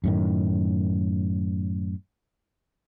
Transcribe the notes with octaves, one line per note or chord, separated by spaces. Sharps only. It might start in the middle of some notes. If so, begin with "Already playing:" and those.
F#2 A2 D#3